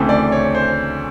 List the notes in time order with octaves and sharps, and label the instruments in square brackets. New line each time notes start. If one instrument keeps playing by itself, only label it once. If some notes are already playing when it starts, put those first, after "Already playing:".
Already playing: [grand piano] D2 C#3 E3 A3 C4
D5
C#5
C5